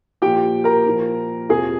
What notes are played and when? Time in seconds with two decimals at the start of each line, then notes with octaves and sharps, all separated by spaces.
0.22 A#2 F3 G4 G5
0.64 A#4 A#5
0.86 A#2 F3
1.49 F2 C3 F3 G#4 G#5